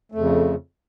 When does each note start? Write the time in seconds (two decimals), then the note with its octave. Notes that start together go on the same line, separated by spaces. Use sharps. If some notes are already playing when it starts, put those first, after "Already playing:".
0.12 A3
0.15 F2
0.18 C#3